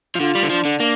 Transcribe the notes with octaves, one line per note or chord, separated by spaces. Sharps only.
F3
D3 F4
G3
D3
F3 D4
D3
A#3